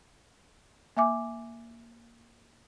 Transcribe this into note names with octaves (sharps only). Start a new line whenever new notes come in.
A#3 E5 G#5 D6